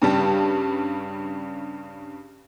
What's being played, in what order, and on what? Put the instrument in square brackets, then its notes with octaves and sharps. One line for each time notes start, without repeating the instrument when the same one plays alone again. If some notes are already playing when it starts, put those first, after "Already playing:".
[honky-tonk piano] G2 C#3 G3 A5